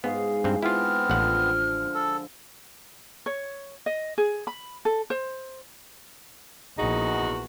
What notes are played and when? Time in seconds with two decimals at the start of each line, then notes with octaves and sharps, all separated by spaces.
0.04 G#2 B3 G#4 F5 G#5
0.44 G2 C4
0.63 B3 C4 E4 F4 F6
1.10 A1 D3 F3 F#5
1.94 A4
3.26 C#5
3.86 D#5
4.18 G#4
4.47 B5
4.85 A4
5.10 C5
6.78 A#1 E2 D#4 F#4 G#4